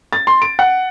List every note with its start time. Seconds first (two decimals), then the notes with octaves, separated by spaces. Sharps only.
0.13 A6
0.27 C6
0.42 D7
0.59 F#5